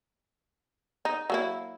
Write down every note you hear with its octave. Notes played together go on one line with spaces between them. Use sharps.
D#4
F#3 A#3 E4